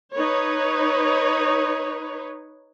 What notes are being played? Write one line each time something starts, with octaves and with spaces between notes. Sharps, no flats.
D#4 B4 C#5